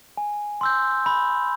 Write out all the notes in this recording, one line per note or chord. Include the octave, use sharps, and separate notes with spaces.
G#5
C6 E6 G6
B5